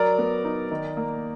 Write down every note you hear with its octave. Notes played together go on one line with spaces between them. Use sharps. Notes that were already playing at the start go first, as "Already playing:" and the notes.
Already playing: F#3 A#4 D5
B3
D#4
D#3
A#3